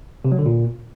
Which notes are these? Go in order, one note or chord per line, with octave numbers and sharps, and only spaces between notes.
C3
F#3
D3
A#2